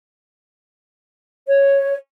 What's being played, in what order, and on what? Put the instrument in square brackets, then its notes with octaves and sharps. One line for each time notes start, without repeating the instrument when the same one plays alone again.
[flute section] C#5